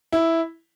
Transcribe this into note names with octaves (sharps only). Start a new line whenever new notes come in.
E4